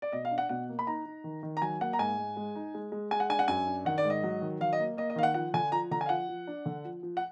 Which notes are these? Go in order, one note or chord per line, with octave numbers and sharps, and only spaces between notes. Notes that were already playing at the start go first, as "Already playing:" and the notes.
D5
B2 D#5
F5
D4
F#5
B2 F#5
A#3
B5
D#4 A#5
D#4
D#3
D#3
A#5
F#3 G#5
A#3 F#5
A#5
G#2 G#5
G#2
G#3
D#4
G#3
G#3
G#3 G#5
F#5
D4 G#5
F#5
F#2 G#5
D4
D#3 F#5
D5
G#2
D#5
F#3
D#3
F#3 F5
D#5
A#3
A#3 D#5
D#5
D#3 F5
F#5
F3 F#5
D3 G#5
F3 A#5
D3 A#5
G#5
F5
F3 F#5
F3
D4
D3
F3
F3
F#5